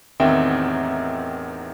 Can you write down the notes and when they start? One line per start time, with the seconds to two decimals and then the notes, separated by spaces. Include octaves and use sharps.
0.20 A1 E2 D#3 C4 E5 G5